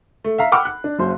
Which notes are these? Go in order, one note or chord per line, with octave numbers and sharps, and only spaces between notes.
A3
E5 F5 A#5
F#5 G5 B5 D6 E6 F6
F#6
D4
F#1 F#2 C5